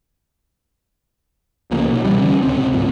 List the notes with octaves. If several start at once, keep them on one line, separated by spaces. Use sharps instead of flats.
C2 C#3 F3 A#3
B1
B1 C3 E3 G3
D3 E3 G3 C#4
D1 C#2 C3 C4
G#1 C#2 F#2 A#2